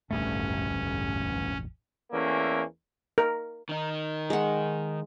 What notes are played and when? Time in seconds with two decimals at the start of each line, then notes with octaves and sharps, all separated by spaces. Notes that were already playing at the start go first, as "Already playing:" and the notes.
0.11 E1 A1 D2 G2 A3 C#4
2.12 E2 E3 A3 A#3 C#4
3.18 A#4
3.69 D#3 D#4
4.30 G#3 F#5